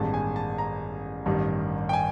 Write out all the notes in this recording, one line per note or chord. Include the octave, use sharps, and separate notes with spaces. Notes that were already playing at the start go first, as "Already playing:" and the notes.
Already playing: A1 G2 D#3 G#3 B3 A5
G#5
A5
A#5
A1 G2 D#3 G3
G5
G#5